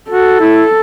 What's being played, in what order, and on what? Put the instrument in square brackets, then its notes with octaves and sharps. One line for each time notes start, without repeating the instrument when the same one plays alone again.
[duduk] F#4 [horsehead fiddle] A4
[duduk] E4